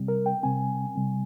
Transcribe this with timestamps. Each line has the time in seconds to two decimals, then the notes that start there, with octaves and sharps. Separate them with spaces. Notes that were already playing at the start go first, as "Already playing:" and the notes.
Already playing: C3 G3 C4
0.08 A#4
0.26 G5
0.43 C3 G3 C4 G#5
0.96 C3 G3 C4